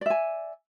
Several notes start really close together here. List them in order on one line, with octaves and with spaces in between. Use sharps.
D5 E5 G#5